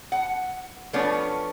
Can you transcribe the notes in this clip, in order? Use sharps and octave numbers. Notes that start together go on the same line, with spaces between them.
F#5
F3 A3 B3 C#4 D4